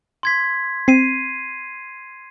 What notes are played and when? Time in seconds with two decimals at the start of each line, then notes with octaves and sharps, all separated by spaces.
0.23 C6 G#6 B6
0.88 C4 C7 D#7